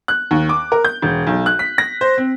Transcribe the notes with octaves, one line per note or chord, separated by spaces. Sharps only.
F#6
D#2
D6
A#4
G6
E1
B1
F#6
B6
A#6
C5
C4